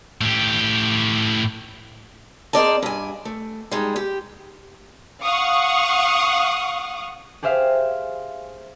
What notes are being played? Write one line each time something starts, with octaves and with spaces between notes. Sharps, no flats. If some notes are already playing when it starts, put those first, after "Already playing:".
A2 G4
C4 G#4 A#4 D5 D#5 A5
G2 G#5
A3
G3 G#3 D#4
G4
F5 F#5 C#6 D#6
G4 G#4 C5 E5 F5